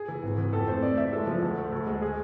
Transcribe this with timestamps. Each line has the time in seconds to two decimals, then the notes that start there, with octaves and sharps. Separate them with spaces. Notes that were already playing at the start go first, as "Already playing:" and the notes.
Already playing: G#4
0.08 E3
0.23 G#1
0.38 E3
0.53 F2 A4
0.68 A3 C5
0.82 A3 D5
0.98 E3 E5
1.13 G#3 A4
1.27 F3
1.42 D2
1.57 A3
1.72 D2
1.87 G#3
2.02 G#4